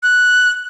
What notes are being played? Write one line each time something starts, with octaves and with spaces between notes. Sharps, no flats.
F#6